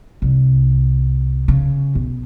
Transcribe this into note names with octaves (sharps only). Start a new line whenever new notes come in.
C2
C#3
B1